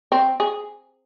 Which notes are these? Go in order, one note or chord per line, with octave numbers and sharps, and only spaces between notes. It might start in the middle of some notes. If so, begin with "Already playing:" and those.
C4
G#4